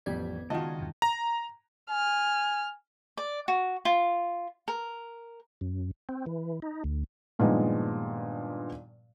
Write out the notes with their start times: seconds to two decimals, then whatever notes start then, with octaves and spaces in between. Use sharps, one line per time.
0.06 A1 F2 G3 B3 D5 G#6
0.50 C#2 D#3 F4 F#4 D#5 A5
0.79 E2 G2 C3
1.02 A#5
1.90 G#5 F6
3.17 D5
3.48 F#4
3.85 F4
4.68 A#4
5.61 F#2
6.09 C4
6.26 E3
6.62 D#4
6.84 D2
7.39 G2 A#2 D#3 F3 G#3 B3